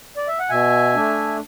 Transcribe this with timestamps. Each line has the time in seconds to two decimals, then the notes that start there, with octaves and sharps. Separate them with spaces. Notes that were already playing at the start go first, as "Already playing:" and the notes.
0.17 D5
0.28 E5
0.40 F#5
0.49 B2 E5 G#5
0.95 A3 D4